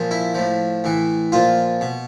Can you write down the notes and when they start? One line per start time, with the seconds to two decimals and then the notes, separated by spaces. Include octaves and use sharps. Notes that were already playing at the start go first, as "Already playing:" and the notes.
Already playing: A#2 F3
0.11 E4
0.34 A2 F3
0.84 A2 E3
1.32 A#2 F3 F4
1.81 B2